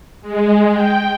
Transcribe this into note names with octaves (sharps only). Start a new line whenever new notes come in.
G#3
G5